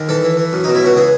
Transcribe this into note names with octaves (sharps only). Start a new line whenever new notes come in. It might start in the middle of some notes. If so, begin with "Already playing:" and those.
Already playing: D#2
E3 A4
E3
E3
F#2
B2 D#4
E4
C#2 F#4
E3 G#4